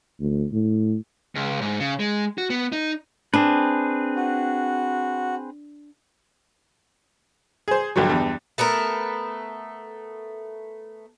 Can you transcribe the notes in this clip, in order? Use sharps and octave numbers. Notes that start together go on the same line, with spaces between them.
D2
A2
C#2
G#2
C#3
G#3
F#4
B3
D#4
C4 D4 G#4 B4
F#4
G#4 C5
A#1 G2 D3 F#3
E2 G2
A3 B3 A4 A#4